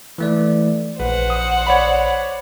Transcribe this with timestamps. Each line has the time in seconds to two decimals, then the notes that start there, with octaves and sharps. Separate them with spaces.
0.18 E3 A3 D5
1.00 A#1 B4 C5 F#5
1.30 D#6
1.67 C#5 D5 B5